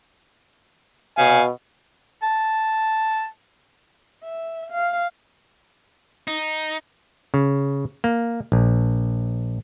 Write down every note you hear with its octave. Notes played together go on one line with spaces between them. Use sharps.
B2 F5 G#5
A5
E5
F5
D#4
C#3
A#3
A#1